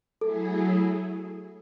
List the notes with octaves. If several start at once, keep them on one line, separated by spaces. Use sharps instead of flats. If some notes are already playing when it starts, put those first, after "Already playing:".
F#3 A3 E4 G#4 A4